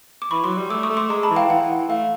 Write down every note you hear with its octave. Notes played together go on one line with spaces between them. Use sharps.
D6
E3 B5 C#6
F#3 C6 D6
G3
A3 D6 E6
C#6 D#6
A3
C6 D6
G#3 A#5 C6
A5 B5
E3
F5 G5
E3 F#5
A3 F5